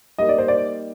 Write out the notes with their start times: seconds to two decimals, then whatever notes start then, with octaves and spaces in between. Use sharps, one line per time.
0.18 G3 A#3 D#4 D#5
0.29 D5
0.38 C5
0.48 D5